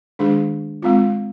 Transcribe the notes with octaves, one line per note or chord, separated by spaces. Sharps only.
D#3 G#3 D4 G#4
G#3 C4 F4